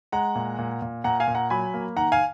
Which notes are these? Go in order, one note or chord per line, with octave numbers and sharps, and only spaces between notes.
G#3 F#5 A#5
A#2
A#2
A#2
A#2 F#5 A#5
F5 G#5
A#2
F#5 A#5
F#3 G#5 B5
A#3
D#3 F#5 A#5
F5 G#5